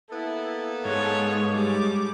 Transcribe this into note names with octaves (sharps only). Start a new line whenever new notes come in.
A#3 B3 E4 A4
G#2 G#3 C#5
G3 D6